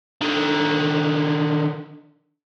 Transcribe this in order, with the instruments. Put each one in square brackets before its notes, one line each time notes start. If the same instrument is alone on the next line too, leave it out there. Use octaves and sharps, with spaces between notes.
[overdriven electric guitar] D3 D#3